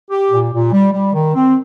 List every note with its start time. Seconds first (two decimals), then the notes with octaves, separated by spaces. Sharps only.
0.11 G4
0.31 A#2
0.52 A#2
0.73 G3
0.92 G3
1.14 D#3
1.34 C4